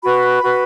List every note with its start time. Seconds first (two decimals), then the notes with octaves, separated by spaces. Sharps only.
0.03 F#4 B4 B5
0.43 F#4 B4